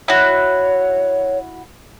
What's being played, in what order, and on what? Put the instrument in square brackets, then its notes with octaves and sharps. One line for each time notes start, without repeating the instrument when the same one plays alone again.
[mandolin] E4 F#4 [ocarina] C#5